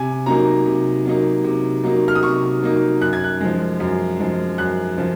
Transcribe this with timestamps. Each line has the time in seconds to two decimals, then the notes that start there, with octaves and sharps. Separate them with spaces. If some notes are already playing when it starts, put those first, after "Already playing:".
Already playing: C3 G#5
0.26 F#3 A#3 D#4 A#5
0.66 C3
1.05 F#3 A#3 D#4
1.44 C3
1.83 F#3 A#3 D#4
2.08 F6
2.15 D#6
2.23 C3 C#6
2.62 F#3 A#3 D#4
3.01 F#2 F#6
3.13 G#6
3.24 F#6
3.41 F3 G#3
3.80 F#2
4.19 F3 G#3
4.58 F#2 F#6
4.98 F3